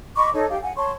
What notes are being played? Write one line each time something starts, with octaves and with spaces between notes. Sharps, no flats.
D#5 B5 C#6 D6
D#4 A4 C#5
G4 F5 G5
F#5 G#5
C#5 A5 C6 C#6